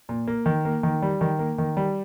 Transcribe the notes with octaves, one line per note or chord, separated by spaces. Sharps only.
A#2
A#3
D#3
A#3
D#3
G3
D#3
A#3
D#3
G3